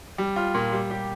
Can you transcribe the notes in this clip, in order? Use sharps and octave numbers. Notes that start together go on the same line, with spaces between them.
G3
F4
A#2
G3
G4